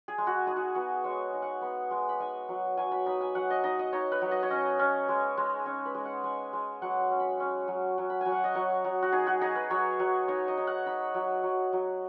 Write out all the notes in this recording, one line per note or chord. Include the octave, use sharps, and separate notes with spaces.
G#4
G#3
F#4
D#4 G#4
F#4
B3 F#4
G#3 C#5
D#4
F#5
B3
G#3
B5
D#4 G#5
F#3
F#3 G#5
B5
D#4 B5
G#5
F#3 F#5
D#5
D#4 D#5
D#5
D#4 C#5
B4
F#3
D#5
C#5
C#4 D#5
C#4
G#3
G#3
C#4
B4
G#3
F#5
G#3 G#5
G#3
F#3 F#5
G#5
C#4
B5
C#4
F#3
F#3
B5
F#3 G#5
F#5
D#5
F#3 C#5
F#3
F#4
D#4 G#4
F#4
D#4 G#4
B4
F#3 C#5
F#3
D#4 C#5
D#5
D#4
F#5
D#4 B5
F#3
F#3
F#3